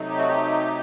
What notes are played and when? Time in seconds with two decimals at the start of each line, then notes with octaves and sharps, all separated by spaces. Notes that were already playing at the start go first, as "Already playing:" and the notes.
Already playing: C3 F#3 A3 D#4
0.08 G4
0.19 F#4
0.28 G4